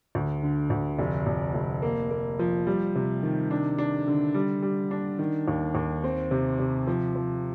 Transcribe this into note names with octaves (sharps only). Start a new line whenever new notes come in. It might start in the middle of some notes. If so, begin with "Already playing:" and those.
D2
D3
D2
F1
F1
F1
A#3
A#3
F3
G3
C3
D#3
D4
D4
D3
G3
G3
D4
D#3
D#2
D#2
C4
C3
C3
F3
F3